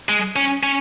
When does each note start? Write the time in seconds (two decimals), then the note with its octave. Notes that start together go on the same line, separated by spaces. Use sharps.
0.09 G#3
0.36 C#4
0.63 C#4